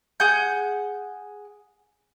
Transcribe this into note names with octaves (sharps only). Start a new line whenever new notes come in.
G#4 F#5 G6